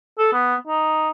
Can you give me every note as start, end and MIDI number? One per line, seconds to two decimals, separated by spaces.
0.19 0.28 69
0.33 0.55 59
0.68 1.09 63